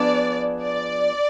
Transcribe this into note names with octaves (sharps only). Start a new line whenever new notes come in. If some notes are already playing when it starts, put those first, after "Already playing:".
Already playing: F3 B3 D4 G#4 B4 D5
D5